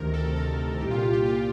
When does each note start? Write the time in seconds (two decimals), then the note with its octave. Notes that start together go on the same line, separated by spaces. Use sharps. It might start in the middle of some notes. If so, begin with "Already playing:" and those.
Already playing: D2 C3 D#3 A#4
0.14 A4
0.36 A4
0.80 C2 A#2 G4
0.91 F4
1.03 F4
1.13 G4
1.26 F4